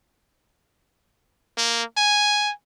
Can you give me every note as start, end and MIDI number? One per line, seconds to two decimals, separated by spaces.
1.58 1.83 58
1.97 2.52 80